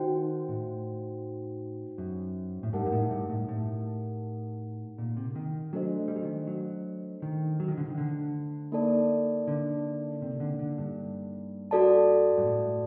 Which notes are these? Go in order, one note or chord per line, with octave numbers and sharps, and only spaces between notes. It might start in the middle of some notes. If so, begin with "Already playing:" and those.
Already playing: D#3 D#4 F#4 C5 G5
A2
F#2
A2
G2 D#4 G4 A#4 F#5 A5
G2
A2
G2
A2
A2
A#2
C3
D#3
F#3 A3 D4 A4 C5 D#5
G3
F#3
D#3
F#3
D#3
F#3
D#3
D3
D#3
D3
A#3 D#4 A4 D5 A5
D3
C3
D3
D3
G2
F#4 A4 D5 A5
G2
A2